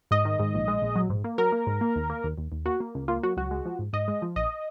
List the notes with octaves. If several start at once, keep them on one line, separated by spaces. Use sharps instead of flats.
G#2 D#5
D#3
G#2
A#1
G#3
A#1
F#3
G#2
A#3
F#3 A#4
A#3
G#2
A#3
D#2
A#3
D#2
D#2
D#2
A#3 F#4
A#3
C#2
A#3 F4
F#3 F#4
C#2 F#4
G#3
F3
G#2
G#2 D#5
G#3
F3
A#1 D#5